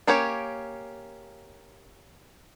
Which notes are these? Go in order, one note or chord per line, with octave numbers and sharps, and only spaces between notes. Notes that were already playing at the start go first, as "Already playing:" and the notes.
A#3 C#4 G4 C#5